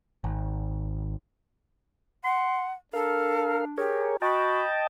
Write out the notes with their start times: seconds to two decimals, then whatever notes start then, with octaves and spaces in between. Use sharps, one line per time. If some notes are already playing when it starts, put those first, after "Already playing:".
0.24 G#1
2.24 F#5 C6
2.93 D4 A4 A#4 F5
3.78 G4 G#4 A#4 C#5
4.22 F#4 D#5 G5 A5 B5